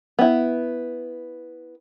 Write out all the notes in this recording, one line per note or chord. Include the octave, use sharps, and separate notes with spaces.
B3 E4